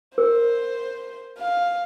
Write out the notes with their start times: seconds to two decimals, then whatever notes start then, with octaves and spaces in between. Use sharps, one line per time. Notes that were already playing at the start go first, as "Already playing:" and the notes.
0.18 A#4 C5
1.38 F5